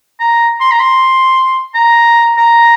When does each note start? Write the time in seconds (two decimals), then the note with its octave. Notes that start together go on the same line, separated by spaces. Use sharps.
0.20 A#5
0.60 C6
0.71 A#5
0.80 C6
1.75 A#5
2.38 A#5